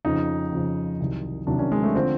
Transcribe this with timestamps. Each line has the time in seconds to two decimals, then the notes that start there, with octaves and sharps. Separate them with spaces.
0.05 F2 C#3 F3 D#4
0.52 F2 C#3 F3
1.00 C2 C3 D#3 F#3
1.47 C2 C3 D#3 F#3 D4
1.59 C#4
1.72 G#3
1.83 A3
1.95 D3 F3 C4